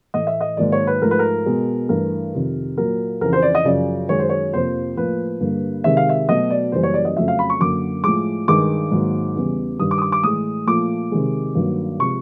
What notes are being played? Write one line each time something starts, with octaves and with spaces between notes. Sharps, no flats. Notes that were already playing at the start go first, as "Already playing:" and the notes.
A2 E3 A3 D#5
E5
D#5
G#2 D#3 F#3 A#3 D5
C#5
B4
G#2 F3 A3 A#4
B4
A#4
B2 G#3
G2 E3 A3 A#4
F2 C3 D#3
A#2 F#3 A#3 A#4
F2 C#3 E3 A#4
C5
D5
D#5
F#2 C#3 F3 D5
F#2 D#3 G#3 C#5
C5
C#5
F2 C3 F3 A#3 C5
A2 F3 A#3 B4
G2 D3 G3 A#3
C3 D#3 G#3 E5
F5
E5
B2 F#3 A3 D#5
D5
F#2 C#3 E3 G3 A#3 C5
C#5
D5
D#5
F2 C#3 F#3 A3 E5
F5
B5
C#6
F#2 D3 F#3 A#3 D6
A2 F3 G#3 D6
G2 D#3 G#3 D6
G#2 D#3 F#3 A#3
E2 C#3 E3 G3
G2 D#3 G3 D#6
D6
D#6
D6
D6
A2 E3 G#3 D#6
A#2 F3 A3 D6
C3 D#3 G#3
G2 D#3 F#3 A#3
C3 F3 G#3 C#6